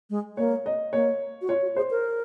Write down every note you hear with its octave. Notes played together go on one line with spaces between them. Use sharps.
G#3
A#3 C#5
D#5
A#3 C#5
F#4
F4 C#5
F#4
G#4 C5
A#4